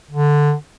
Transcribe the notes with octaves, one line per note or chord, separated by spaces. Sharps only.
D3